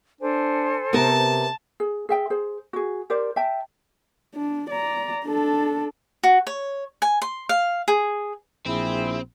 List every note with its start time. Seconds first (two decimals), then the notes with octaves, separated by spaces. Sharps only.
0.21 D4 A4 C5 G#5
0.93 C3 B3 A#4 A5
1.80 G#4
2.09 G#4 E5 G5
2.30 G#4 C5
2.73 F#4 G#4
3.10 G4 A#4 C5 D5
3.36 E5 G5 A5
4.35 D4
4.70 D5 A#5
5.25 D4 A4
6.23 F#4
6.47 C#5
7.02 G#5
7.22 C6
7.49 F5
7.88 G#4
8.66 A#1 C4 E4 G#4 B5